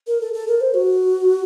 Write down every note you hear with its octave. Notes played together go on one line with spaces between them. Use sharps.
A#4
A4
A4
A#4
C5
F#4